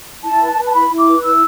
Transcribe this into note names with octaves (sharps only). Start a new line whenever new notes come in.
E4 A5
B4
B4
A5
E4 B5
E4
D6
B4
E4 E6